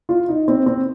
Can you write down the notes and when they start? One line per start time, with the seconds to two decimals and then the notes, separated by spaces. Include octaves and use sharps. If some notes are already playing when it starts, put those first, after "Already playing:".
0.09 F4
0.29 D#4
0.48 C4
0.66 C4